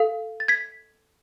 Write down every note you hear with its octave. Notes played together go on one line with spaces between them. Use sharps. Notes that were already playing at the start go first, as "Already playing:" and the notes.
Already playing: A4 F5
A6
G#6 B6